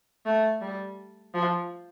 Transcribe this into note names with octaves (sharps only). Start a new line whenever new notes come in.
A3
G3
F3